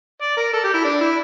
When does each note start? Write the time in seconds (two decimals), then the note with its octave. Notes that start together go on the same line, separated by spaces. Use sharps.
0.22 D5
0.37 A#4
0.53 A4
0.64 G4
0.74 E4
0.85 D4
1.01 E4